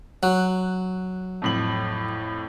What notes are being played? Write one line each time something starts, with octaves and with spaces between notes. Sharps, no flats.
F#3 F#6
F2 A2 F#7